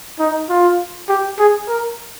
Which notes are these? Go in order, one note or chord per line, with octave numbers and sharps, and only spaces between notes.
D#4
F4
G4
G#4
A#4